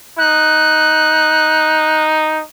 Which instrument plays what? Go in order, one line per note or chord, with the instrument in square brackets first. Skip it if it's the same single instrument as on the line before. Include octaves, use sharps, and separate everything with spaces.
[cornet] D#4 [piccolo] F#6